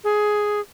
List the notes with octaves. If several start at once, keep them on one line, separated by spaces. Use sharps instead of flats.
G#4